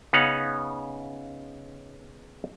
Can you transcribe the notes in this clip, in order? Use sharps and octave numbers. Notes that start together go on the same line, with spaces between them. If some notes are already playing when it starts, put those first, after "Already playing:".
C#3 B3 C#4 D#4 F5 F#5